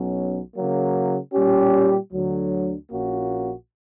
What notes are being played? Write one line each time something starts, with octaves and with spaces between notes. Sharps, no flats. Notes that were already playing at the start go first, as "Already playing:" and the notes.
Already playing: B1 B2 F#3 C#4
C#3 F#3 A#3
A#2 G3 C#4 G4
D2 D3 F#3
A#1 A#2 A#3 C#4 F#4